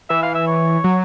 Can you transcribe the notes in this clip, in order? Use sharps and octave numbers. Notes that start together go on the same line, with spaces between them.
E3 E5
F5
E5
C#5
F#3